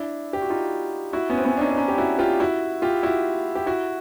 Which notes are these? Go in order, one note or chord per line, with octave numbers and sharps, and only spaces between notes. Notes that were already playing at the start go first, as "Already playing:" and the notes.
Already playing: D4 E4
G4
F#4
D#4 F4
E4 F#4
B3 C#4
C4
B3 C#4
D4
C#4 D#4
D4
C#4 D#4
G4
E4 F#4
F4 G4
E4 F#4
F4 G4
E4 F#4
G4
E4 F#4